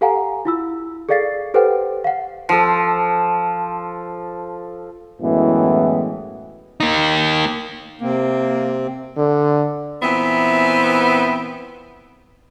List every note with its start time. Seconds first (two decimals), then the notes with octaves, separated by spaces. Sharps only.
0.01 G4 A4 F5 F#5 G#5 A#5
0.45 E4 F4 E6
1.09 G#4 A4 D5 F5 A6 C7
1.54 G4 A4 B4 C5 F#5 G5
2.04 F5 F#5
2.49 F3 A4
5.21 F#2 A2 E3 G#3 B3
6.80 A#3 D#4
8.01 C3 A#3 C4
9.17 D3
10.01 A#2 E3 B3 C4 E5